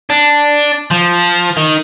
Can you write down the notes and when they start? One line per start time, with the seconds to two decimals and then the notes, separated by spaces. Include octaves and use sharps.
0.10 D4
0.91 F3
1.57 D#3